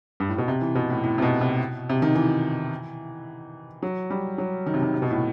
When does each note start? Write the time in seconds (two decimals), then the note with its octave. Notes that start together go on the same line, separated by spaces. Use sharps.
0.20 G2
0.29 A2
0.38 B2
0.48 C3
0.61 E3
0.75 B2
0.90 A2
1.03 A2
1.18 C3
1.22 B2
1.41 C3
1.89 C3
2.02 D#3
2.15 E3
3.83 F#3
4.10 G3
4.38 F#3
4.66 D#3
4.74 C3
4.82 D#3
4.94 C3
5.02 B2
5.11 A2